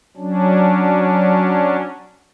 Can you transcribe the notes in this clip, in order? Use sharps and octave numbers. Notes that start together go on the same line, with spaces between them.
F#3 C#4 D4